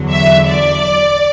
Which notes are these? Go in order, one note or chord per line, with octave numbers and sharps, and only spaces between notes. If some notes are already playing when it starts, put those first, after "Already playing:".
Already playing: E2 D3 F#3
E5
D5